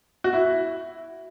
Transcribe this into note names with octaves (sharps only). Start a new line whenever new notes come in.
F#4
E4